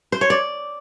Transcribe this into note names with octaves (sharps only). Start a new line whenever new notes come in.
C5
C#5
D5